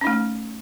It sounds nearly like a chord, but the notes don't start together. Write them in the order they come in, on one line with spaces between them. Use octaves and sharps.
C#4 D#4 A3